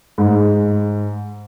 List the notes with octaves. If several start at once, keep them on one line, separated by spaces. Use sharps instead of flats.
G#2